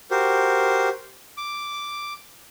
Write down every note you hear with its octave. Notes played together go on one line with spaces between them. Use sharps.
F#4 G4 A#4 C5
D6